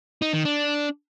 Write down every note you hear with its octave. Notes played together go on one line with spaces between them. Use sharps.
D#4
D#3
D4